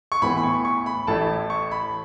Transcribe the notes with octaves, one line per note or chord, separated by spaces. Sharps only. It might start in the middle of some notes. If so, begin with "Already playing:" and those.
C#6
A2 E3 B3 B5
B5
C#6
C#6
B5
A1 A2 A3 A5
C#6
B5